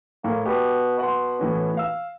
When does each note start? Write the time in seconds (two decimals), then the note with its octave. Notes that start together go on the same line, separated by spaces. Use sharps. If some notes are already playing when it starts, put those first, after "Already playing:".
0.24 A2 A#3
0.45 B2 G4
0.99 B2 F#5 C6
1.39 A2 E3 C#4
1.77 F5 E6